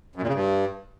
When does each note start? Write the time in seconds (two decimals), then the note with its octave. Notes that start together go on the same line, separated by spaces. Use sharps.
0.16 F#2
0.22 A#2
0.27 C#3
0.33 G2